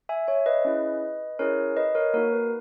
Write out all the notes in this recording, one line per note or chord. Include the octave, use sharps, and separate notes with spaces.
E5 G#5
C#5 E5
B4 D#5
C#4 E4 G#4
C#4 E4 G#4 A#4 C#5
B4 D#5
A#4 C#5
A#3 D#4 F#4 A#4
B4